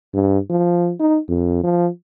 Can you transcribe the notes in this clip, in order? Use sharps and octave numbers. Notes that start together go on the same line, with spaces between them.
G2
F3
D#4
F2
F3